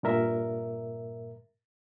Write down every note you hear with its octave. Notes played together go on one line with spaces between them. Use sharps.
G2 A#2 A#4 E5